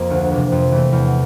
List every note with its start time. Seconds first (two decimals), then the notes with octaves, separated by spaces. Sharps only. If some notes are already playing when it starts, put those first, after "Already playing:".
Already playing: F2 A#3
0.10 D2
0.32 C3 E3
0.52 F2
0.72 E3 A3
0.93 E2